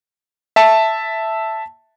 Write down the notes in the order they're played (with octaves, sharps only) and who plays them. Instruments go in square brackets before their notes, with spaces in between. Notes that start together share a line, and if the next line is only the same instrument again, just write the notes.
[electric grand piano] E5 A5